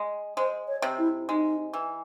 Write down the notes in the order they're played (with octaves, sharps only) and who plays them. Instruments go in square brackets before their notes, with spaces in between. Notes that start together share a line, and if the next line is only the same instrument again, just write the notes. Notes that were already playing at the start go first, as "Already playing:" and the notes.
Already playing: [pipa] G#3
[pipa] G#3 [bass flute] C5
[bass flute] C#5
[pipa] C3
[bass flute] E4
[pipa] G#3 [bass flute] D#4
[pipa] E3